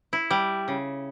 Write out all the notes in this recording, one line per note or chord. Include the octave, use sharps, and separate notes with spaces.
E4
G3
C#3